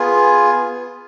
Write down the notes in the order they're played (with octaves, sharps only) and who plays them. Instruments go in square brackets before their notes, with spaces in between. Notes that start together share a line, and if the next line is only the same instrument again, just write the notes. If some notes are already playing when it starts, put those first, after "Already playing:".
Already playing: [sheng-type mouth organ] B3 F4 G#4